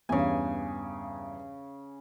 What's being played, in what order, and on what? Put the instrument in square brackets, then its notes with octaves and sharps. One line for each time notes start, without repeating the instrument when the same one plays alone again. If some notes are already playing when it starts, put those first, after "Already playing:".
[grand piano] E2 G2 C#4 [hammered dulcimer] C#3 G#5